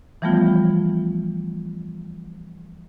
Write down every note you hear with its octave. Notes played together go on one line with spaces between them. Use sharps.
E3 F3 G3 A3 B3 F4